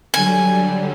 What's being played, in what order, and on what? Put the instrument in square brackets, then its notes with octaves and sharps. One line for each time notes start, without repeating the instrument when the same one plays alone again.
[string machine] D3 F#3 G3 [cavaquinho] G#5